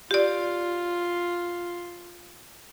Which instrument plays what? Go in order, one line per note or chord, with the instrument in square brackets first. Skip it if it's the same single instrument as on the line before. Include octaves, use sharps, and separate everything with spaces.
[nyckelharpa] F4 [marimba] G4 D5